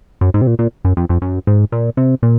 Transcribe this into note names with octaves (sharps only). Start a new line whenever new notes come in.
F#2
G#2
C3
A#2
A#2
F#2
F2
F2
F#2
G#2
A#2
C3
A#2